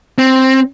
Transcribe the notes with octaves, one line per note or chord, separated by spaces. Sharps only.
C4